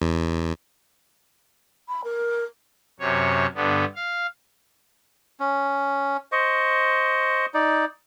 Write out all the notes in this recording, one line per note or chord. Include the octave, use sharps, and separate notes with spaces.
E2
B5
A#4
F#2 C3 C#5
G2 D3 B3
F5
C#4
C5 D#5 C#6
D#4 D5